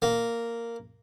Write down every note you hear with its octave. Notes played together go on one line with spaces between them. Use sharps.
A#3